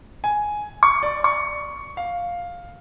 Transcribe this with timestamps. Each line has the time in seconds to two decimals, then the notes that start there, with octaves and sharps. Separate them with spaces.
0.24 G#5
0.83 C#6
1.03 D5
1.24 C#6
1.97 F5